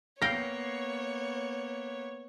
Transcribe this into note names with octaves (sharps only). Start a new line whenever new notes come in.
A#3 B3 C#5 F5 G5 A#6 C7